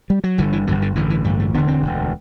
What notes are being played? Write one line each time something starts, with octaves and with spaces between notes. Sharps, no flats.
G3
F#3
G1 G2 D3 E3
E3
G1 G2 D3 F#3
D3
A1 G2 D3 E3
E3
A1 G2 D3 G3
A3
E1 D2 D3 B3
C4
E1 D2 D3